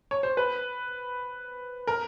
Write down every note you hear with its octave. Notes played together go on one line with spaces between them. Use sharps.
C#5
C5
B4
A#4